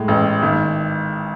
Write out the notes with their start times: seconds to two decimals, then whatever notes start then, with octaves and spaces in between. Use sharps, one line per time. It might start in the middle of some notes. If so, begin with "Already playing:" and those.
Already playing: A2 G#3
0.08 A1
0.42 G#1